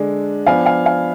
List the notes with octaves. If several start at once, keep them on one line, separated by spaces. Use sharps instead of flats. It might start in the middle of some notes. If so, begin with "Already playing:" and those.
Already playing: D3 G#3 D4
F3 B3 D4 F5 G#5
F5 G#5
F5 G#5